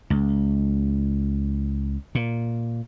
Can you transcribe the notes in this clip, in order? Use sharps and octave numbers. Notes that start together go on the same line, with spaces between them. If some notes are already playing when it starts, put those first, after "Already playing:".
C#2
A#2